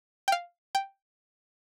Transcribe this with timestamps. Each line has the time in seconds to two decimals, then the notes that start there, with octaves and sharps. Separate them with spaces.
0.28 G5
0.32 F5
0.75 G5